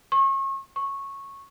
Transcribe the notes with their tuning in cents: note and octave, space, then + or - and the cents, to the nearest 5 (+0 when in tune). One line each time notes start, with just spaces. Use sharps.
C#6 -35
C#6 -10